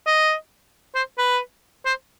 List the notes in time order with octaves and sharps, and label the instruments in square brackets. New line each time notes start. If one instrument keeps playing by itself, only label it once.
[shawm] D#5
C5
B4
C5